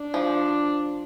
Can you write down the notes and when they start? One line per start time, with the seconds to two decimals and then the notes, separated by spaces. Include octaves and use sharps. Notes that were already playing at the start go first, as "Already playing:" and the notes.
Already playing: D4
0.14 F3